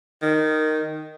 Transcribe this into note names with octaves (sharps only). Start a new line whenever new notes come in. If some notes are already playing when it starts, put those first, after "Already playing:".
D#3